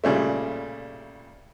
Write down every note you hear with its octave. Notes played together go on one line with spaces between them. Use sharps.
A#2 C#3 G3 A3